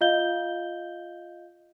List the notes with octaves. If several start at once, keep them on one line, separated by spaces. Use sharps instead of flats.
F4 D#5 F5 G6 G7